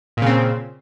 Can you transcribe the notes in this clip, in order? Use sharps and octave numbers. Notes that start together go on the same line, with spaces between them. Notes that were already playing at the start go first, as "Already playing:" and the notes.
A#2 C#3 C4